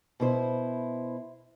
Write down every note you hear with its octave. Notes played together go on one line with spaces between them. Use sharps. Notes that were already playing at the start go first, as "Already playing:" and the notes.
B2 E4 C5